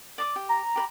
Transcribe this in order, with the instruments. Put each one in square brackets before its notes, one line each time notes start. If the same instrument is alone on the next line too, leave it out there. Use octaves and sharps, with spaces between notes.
[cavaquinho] D5 D6 D#6
G4
[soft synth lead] A#5
[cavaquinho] G4 B4 B5